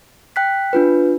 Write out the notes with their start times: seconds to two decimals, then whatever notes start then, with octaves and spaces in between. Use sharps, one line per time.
0.36 G5 F#6 B6
0.73 D4 F4 B4